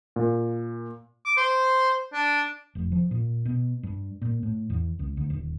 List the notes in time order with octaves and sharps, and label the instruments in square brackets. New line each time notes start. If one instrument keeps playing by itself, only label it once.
[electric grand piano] A#2
[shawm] D6
C5
D4
[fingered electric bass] F1
F3
A#2
B2
G2
A#2
A2
E2
C#2
D2
D#1